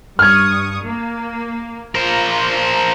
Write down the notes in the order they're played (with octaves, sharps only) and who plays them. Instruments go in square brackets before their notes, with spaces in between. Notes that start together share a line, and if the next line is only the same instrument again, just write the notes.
[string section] G2 C#6 D#6 [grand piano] F6 G#6
[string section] A#3
[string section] F4 A#5 [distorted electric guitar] A#4 C5